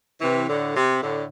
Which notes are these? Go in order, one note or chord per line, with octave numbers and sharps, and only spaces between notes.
C3 E3
A2 D3
C3
A2 D3